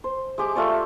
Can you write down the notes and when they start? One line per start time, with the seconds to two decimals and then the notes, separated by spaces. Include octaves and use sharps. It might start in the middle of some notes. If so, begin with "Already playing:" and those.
0.04 C5
0.38 G#3 G4 D6
0.56 A3 F4 D5 C#6